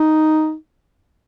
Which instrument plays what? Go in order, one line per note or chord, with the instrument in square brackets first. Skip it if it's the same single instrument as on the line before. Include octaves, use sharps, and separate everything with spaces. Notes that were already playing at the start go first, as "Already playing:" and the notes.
Already playing: [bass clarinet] D#4